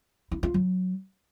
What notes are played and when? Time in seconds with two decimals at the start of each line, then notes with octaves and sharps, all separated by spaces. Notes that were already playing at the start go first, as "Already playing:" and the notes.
0.31 E4
0.43 F4
0.54 F#3